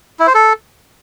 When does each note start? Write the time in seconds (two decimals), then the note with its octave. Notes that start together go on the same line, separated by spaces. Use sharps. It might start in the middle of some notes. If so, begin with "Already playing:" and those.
0.19 E4
0.27 C5
0.35 A4